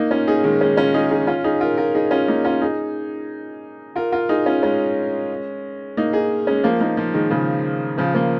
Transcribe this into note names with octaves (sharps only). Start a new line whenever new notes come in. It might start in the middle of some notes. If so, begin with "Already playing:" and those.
Already playing: A#3 D#4
C#4 F4
D#4 G#4
D#3 G#3
G#3 C#4
C#4 F4
D#4 G#4
D#4 G#4
C#4 F4
D#4 G#4
F4 A#4
F4 A#4
D#4 G#4
C#4 F4
A#3 D#4
C#4 F4
D#4 G#4
F4 A#4
F4 A#4
D#4 G#4
C#4 F4
G#3 C#4
A#3 D#4
D#4 G#4
G#3 C#4
F3 A#3
A#3 D#4
F3 A#3
D#3 G#3
C#3 F3
C#3 F3
F3 A#3